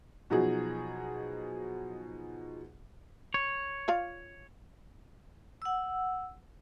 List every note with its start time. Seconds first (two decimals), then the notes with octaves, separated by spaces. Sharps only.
0.30 B2 F3 F#3 D#4 F#4 G#4
3.34 C#5
3.88 F4 D5 F5
5.62 F#5 E6